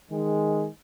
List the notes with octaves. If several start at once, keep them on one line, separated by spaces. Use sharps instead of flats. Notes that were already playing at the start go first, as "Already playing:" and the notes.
D#3 G#3